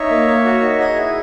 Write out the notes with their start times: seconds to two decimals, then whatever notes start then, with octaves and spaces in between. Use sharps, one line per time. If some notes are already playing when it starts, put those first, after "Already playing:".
Already playing: D#4 C#5 E5
0.10 A#3
0.27 A#3
0.45 F#4
0.62 D#4
0.79 G#4 D#5 F#5
0.97 E4